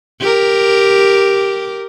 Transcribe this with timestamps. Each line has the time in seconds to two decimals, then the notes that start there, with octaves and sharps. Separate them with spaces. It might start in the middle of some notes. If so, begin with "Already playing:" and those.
0.21 G4 A#4